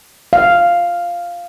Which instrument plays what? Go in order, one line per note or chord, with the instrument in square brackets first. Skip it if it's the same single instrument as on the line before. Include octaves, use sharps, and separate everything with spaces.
[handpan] F5